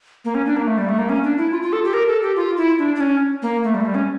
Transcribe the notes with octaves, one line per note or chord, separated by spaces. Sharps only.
A#3
C#4
D4
A#3
A3
G3
A3
A#3
C#4
D4
E4
F4
F4
A4
G4
A#4
A4
G4
F4
E4
D4
D4
C#4
A#3
A3
G3
A3
G3
C#4